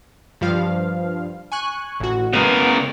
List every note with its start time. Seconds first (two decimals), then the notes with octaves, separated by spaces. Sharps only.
0.41 G2 F3 F5
1.52 G#5 C#6 F#6
2.00 A1 F#4
2.33 C#3 G#3 B3 A#4